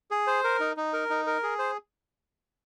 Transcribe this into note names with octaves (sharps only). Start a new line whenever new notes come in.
G#4
C5
A#4
D#4
D#4
A#4
D#4
A#4
G#4
C5